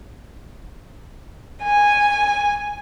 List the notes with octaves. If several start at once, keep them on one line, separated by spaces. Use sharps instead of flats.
G#5